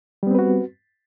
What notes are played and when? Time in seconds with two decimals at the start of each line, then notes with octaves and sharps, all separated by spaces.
0.23 G3
0.27 B3
0.31 C4
0.35 B4
0.39 F#4